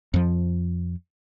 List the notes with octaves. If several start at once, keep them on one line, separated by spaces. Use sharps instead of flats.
F2 F3